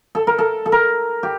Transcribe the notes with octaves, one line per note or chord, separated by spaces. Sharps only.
A4
A#4
A4
A4
A#4
G4